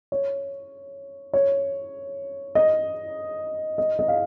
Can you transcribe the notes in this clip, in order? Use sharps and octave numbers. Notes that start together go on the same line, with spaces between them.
C#5
C#5
D#5
D#5
D#5
F5